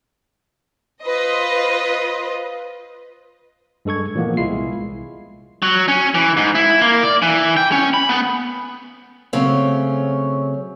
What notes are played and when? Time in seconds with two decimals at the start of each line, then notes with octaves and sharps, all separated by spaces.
1.03 F4 B4 C5 D#5
3.85 G2 G#3 A4 C#6 G#6
4.15 A#2 E3 F3 G#3 A#3 B3
4.37 C2 G#3 E4 F4 C7
5.62 F#3
5.88 C#4
6.14 E3
6.37 G#2
6.55 E4
6.81 A#3
7.03 D5
7.22 E3
7.57 G5
7.72 C#4
7.94 B5
8.09 B3
9.33 C#3 F#3 A3 C4 C#4